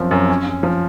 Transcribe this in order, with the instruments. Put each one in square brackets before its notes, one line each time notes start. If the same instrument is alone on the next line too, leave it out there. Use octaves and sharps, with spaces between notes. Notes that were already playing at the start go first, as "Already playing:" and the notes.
Already playing: [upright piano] F#2 F3 C4
F#2
C#4
C#4
F3